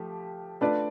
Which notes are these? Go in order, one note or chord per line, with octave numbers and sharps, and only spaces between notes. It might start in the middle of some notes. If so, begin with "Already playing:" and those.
Already playing: F3 A3 G4
A3 D4 F4 B4 D5